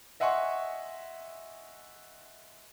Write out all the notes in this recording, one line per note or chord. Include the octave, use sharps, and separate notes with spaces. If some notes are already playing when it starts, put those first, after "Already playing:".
D#5 E5 F#5 G#5 C6 C#6